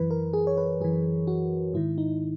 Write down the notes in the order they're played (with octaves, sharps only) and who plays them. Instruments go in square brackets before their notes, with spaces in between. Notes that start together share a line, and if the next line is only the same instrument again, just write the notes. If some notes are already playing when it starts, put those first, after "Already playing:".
Already playing: [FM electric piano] F#2 E3 B4
A#4
G#4
C#5
B4
F#2 E3 G#4
F#4
G#2 D#3 E4
D#4